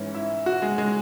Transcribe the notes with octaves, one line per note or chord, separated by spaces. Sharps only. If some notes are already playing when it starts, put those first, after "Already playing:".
Already playing: G#2 E3 C#4
E4
F#4
G#3
G#3